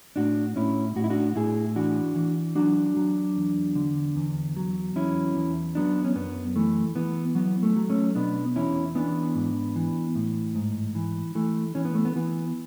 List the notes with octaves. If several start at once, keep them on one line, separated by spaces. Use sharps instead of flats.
A2 D4 F#4
A2 C#4 E4
A2 F#4
E4
D4 F#4
A2 E4 G#4
E3 D4 F#4
E3
F#3 D4 F#4
F#3
E2
D3
E2
F#3
E2 C#4 E4
E2
F#3 B3 D4
C#4
F#2 B3
E3 A3
E3 B3
F#3 B3
A3
F#3
A3 C#4
B2 B3 D4
E2 C#4 E4
E3 B3 D4
G#2
E3
A2
G#2
E3
E3 A3
E3 C#4
B3
A3
B3
E3 B3